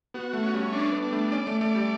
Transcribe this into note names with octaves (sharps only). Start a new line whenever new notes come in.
B3 F#4
A3
C#4
G3
D4
B3
D4
A3
C#4 D5
A3
A3 D5
G3